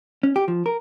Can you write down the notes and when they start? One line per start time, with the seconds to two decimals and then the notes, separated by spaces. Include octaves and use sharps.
0.23 C#4
0.36 G4
0.48 F3
0.66 A#4